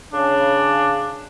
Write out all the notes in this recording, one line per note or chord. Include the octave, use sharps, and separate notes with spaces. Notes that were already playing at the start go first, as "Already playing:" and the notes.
C#3 D4